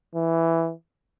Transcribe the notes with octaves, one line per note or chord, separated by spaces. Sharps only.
E3